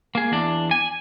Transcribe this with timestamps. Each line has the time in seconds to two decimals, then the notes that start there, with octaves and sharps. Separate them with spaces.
0.15 A#3 G#4
0.32 E2 D4
0.71 G#5